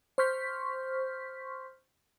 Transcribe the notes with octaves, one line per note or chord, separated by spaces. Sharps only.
C5 C6 C#6 F6 G6 B6